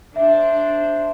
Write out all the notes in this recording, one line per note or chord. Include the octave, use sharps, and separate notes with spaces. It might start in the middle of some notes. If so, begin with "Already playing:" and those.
D4 C5 E5